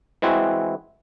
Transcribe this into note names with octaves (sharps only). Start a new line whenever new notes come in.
E3 G#3 C4 E4 F#4